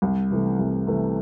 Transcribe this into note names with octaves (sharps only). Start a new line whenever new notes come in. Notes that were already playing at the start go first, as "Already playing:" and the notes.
C2
C3 E3 A3
C2
C3 E3 A3